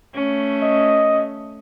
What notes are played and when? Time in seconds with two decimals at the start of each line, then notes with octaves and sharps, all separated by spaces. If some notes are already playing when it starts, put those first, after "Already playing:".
0.15 A3 C#4
0.62 D#5